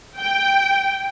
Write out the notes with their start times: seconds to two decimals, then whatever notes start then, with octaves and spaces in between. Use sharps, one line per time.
0.17 G5